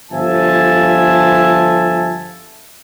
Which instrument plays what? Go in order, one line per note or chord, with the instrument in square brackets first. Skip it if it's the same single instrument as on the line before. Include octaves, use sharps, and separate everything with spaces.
[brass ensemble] G1 F3 A4 E5 G#5 A5